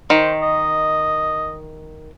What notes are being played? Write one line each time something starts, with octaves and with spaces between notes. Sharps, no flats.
D#3 C5
D#5